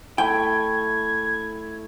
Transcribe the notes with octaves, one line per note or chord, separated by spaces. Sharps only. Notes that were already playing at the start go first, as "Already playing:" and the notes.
A3 E4 G5 G#6